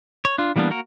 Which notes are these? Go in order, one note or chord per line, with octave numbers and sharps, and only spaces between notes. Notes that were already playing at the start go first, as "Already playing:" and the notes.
C#5
D4 F4
E3 G3 A#3 B3 D4
A#3 F#4 A#4